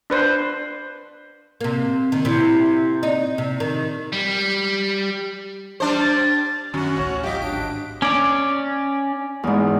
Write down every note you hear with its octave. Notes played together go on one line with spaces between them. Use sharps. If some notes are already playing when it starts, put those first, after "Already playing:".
D4 B4 C5
C3 A#3
D#3
C3 E4
D#4
C3
D#3
G3
G3 D4 C5
A6
F#2 D#3 C#4 F#4 F#5
A1 D2 A2 C#5
F#3 F4 G4 D#5 D6 B6
G#1 D4 D7
C#4 D5 D6
E2 G#2